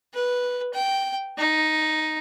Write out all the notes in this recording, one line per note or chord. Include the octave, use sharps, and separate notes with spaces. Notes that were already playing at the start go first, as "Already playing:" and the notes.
B4
G5
D#4